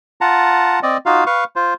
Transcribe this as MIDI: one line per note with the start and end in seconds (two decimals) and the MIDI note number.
0.21 0.79 65
0.21 0.79 78
0.21 0.79 81
0.21 0.79 82
0.83 0.97 60
0.83 0.97 74
0.83 0.97 75
1.06 1.24 63
1.06 1.24 65
1.06 1.24 66
1.06 1.24 77
1.27 1.44 71
1.27 1.44 77
1.27 1.44 85
1.56 1.74 65
1.56 1.74 72